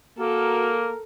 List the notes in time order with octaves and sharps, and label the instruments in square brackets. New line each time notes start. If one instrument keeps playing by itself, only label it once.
[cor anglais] A#3 [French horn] F#4 [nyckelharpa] A4 [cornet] A#4